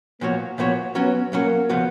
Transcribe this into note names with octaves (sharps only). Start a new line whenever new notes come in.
A#2 F3 A#3 B3 F#4 C#5
A#2 F3 B3 F#4 C#5
F#3 B3 C#4 F#4
F#3 A#3 C#4 F#4
C#3 F3 B3 F#4